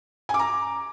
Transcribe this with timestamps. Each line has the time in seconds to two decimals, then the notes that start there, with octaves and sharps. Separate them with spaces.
0.29 G#5
0.34 D6
0.39 A#5